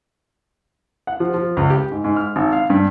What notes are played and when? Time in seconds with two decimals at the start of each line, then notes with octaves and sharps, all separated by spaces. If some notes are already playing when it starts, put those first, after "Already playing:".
1.07 F#5
1.20 F3
1.34 F3
1.57 C#2
1.70 G4
1.91 G#2
2.04 G#2
2.16 F6
2.36 G#1
2.52 F5
2.70 G2